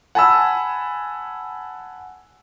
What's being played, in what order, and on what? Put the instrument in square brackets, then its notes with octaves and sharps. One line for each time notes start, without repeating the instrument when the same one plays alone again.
[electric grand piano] F#5 G#5 A5 B5 E6